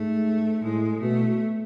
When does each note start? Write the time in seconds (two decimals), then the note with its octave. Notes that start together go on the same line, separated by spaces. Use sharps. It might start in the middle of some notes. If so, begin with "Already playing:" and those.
Already playing: G#2 A3
0.63 A2 G#3
1.00 B2 A3